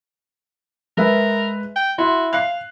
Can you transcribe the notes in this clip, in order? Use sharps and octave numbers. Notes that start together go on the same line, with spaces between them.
G#3 A#4 B4 E5
G5
E4 F#4 C6
F5 F#6 C7